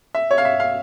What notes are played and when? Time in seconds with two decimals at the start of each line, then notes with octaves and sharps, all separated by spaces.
0.15 E5
0.31 C#5
0.38 F5
0.45 E5
0.60 F5